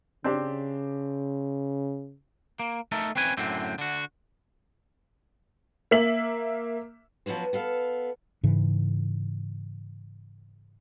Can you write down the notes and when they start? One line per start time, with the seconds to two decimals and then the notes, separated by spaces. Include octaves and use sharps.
0.24 C#3 C4 D4 G4
2.60 A#3
2.92 A3 D#4 A4 A#4
3.16 C4 C#4 B4 G#5
3.37 F#2 A2 D3 C4
3.79 D3 F#4
5.91 A#3 E5 B6 F#7
7.26 F3 F#3 B3 C#4 C5
7.53 B3 A4 F5
8.43 G#2 C#3 E3